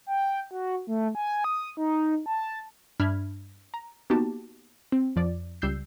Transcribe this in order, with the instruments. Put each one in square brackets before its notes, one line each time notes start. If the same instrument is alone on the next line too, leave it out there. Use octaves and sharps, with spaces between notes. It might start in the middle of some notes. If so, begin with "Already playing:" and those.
[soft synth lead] G5
F#4
A3
G#5
D#6
D#4
A5
[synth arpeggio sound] G2 D4 E5 B5 F6 G#6
A#5
A#3 B3 D#4 F#4 G4 A5
C4
F2 F3 D5
C#2 G3 E6 G6 C7